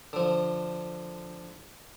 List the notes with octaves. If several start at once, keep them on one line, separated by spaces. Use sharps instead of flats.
D3 F3